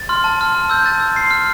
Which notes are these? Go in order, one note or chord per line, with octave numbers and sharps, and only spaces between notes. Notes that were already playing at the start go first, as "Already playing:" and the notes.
Already playing: A6
C6 F6
A5
C6 F6
A5
E6 G6
A5 A6
E6 G6
C6 C7
F6